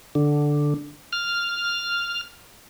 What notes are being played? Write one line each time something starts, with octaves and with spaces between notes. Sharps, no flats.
D3
F6